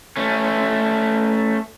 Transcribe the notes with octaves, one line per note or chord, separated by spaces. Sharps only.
A3 C#4